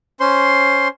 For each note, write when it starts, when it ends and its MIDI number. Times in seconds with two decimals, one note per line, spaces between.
0.20 0.88 61
0.20 0.88 72
0.20 0.88 84